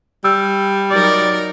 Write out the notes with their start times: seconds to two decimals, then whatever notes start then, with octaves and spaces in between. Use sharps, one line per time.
0.24 G3 E6
0.90 F#3 D#4 A#4 D5